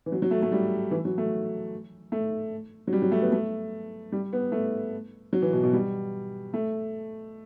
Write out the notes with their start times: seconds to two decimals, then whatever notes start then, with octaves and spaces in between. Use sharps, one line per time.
0.06 E3
0.12 F#3
0.22 F#3
0.31 A3
0.42 A3
0.52 G3
0.91 E3
1.05 F#3
1.18 A3
2.12 A3
2.87 F#3
2.93 G3
3.02 F#3
3.12 A3
3.22 B3
3.32 A3
4.12 G3
4.33 B3
4.52 A3
5.33 F#3
5.42 E3
5.53 B2
5.63 B2
5.73 G3
6.54 A3